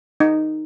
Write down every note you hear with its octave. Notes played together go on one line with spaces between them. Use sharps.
D#4